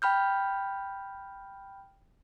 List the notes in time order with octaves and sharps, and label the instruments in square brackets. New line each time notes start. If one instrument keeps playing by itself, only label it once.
[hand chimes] G5 B5 F6 G6